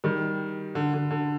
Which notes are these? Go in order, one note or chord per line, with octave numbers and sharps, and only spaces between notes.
D#3 G3
D3
D3
D3